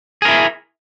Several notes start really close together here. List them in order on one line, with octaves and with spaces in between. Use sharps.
G#4 A#4 E4